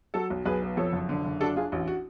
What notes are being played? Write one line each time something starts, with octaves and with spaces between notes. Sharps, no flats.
F#3 F#4 A4
B1
B1 G#4 B4
B3
F2 A4 C#5
F#1
D3
F#1
D4 F#4 A4
D4 F4 G#4
A1 F#4
F#4